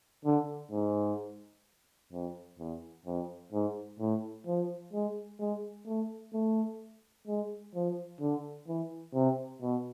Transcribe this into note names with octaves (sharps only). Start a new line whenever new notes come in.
D3
G#2
F2
E2
F2
G#2
A2
F3
G#3
G#3
A3
A3
G#3
F3
D3
E3
C3
B2